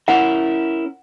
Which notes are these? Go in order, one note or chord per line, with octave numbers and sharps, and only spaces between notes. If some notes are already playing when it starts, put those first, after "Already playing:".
C#4 E4 A#4 F#5